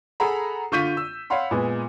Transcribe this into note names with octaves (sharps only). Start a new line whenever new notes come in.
G#4 A4 F#5 A#5 B5
D3 F4 C#6 G6 B6 D#7
E6
C#5 F5 F#5 B5 C6
A#2 G#3 B3